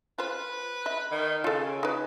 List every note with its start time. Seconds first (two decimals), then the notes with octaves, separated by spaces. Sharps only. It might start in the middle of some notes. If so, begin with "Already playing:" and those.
0.18 F4 B4 C5
0.86 D#5 E5
1.11 D#3
1.44 C#3 F4 A4
1.83 D#4 B4